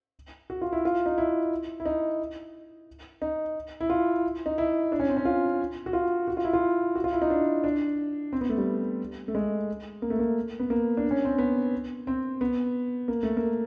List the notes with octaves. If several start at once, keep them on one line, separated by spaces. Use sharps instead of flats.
F#4
F4
E4
F4
D#4
E4
E4
D#4
D#4
E4
F4
D#4
E4
D4
C#4
C4
C#4
F4
F#4
F4
F#4
F4
E4
F4
F#4
F4
E4
D#4
D4
D4
C4
B3
A3
G3
A3
G#3
A#3
A3
A#3
B3
A#3
D4
C#4
C4
B3
C4
B3
A#3
A3
A#3